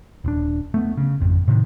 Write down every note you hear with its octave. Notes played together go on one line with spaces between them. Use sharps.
D#1 D4
A3 B3
C#3
G#1 F2
A2 C3 D#3